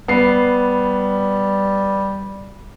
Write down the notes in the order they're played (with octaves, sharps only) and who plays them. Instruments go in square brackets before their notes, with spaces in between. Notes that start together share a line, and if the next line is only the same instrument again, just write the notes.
[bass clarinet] G3 [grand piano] B3 C7